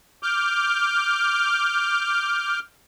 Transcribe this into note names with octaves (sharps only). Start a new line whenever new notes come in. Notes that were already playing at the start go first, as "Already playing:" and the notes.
D6 F6 G6